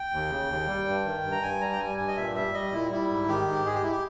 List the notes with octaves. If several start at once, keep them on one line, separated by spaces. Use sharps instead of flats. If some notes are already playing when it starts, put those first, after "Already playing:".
Already playing: G5
D#2
C#3
D#2
G3
G2
D#3
G2
A#5
G2 G#5
G3 A#5
G5
G3 G#5
G2 G#5
D#5
A#2 E5
G3 E5
G3 D#5
A#2 E4
G3 E4
G#2
D#3 G4
G#2
G#3 G#4
G4
E4
G4